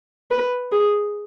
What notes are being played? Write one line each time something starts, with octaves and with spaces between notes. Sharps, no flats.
B4
G#4